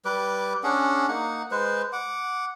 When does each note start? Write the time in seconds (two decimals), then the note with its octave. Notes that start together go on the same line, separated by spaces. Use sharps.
0.05 G3 B4 D6
0.64 C#4 D4 G#4 F#5
1.08 A#3 D#4 F#5
1.51 G#3 B4 C5
1.92 F#5 D6